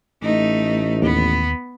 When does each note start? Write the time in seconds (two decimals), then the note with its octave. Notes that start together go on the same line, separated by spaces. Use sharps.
0.22 A1 A3 D#4
1.02 D#2 B3